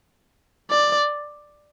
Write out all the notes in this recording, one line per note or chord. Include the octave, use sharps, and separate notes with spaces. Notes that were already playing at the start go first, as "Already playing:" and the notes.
D5